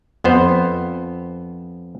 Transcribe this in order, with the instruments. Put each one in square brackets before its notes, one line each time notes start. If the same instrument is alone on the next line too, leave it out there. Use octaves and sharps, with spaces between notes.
[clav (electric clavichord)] F2 B3 C5